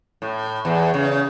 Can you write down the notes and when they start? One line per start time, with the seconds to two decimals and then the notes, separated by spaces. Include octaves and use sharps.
0.22 A2
0.65 E2
0.94 C#3